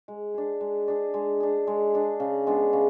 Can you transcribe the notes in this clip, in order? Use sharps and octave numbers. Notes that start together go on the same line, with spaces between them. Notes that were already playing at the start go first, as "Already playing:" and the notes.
G#3
D4 G#4
G#3
D4 G#4
G#3
D4 G#4
G#3
D4 G#4
C#3
G#3 B3 D4
C#3